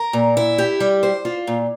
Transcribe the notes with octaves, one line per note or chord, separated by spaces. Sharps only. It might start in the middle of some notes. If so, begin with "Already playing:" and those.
Already playing: A#4
A#2
E4
G4
G3
C5
F4
A#2